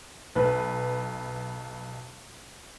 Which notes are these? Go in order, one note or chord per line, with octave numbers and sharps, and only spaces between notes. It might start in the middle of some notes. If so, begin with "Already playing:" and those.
B1 B4